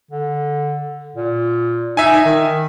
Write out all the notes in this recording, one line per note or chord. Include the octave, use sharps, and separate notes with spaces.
D3
A#2
D#4 E5 G#5
D#3